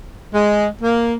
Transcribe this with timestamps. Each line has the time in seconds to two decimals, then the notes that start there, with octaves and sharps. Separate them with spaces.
0.34 G#3
0.82 A#3